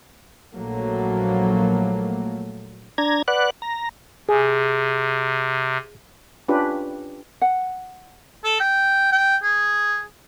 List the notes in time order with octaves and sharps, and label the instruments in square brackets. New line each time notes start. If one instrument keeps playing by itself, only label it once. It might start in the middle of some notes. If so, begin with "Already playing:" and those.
[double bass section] A#1 F#3 A3 A#3
[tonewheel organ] D4 A#5 G#6
B4 D5 F#5 F#6
A#5
[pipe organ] C3 [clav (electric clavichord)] G#4
[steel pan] C#4 D4 F4 G4 B4
[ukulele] F#5
[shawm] A4
G5
G5
G#4